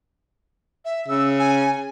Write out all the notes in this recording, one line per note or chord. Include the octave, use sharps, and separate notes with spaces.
E5
C#3 E6
G#5